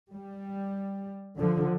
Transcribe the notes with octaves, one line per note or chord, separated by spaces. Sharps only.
G3
D3 F3